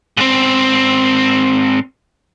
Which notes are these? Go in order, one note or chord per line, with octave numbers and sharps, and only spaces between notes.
G#2 C4